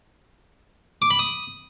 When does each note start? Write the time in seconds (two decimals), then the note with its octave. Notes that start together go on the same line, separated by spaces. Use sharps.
1.02 D6
1.11 B5
1.19 D#6